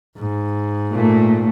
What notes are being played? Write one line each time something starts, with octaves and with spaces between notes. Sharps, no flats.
G#2
A#2 A3